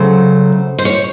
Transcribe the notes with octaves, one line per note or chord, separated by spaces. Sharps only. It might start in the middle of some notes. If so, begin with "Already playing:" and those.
Already playing: C#3 F#3 A3 C5
C5
C#5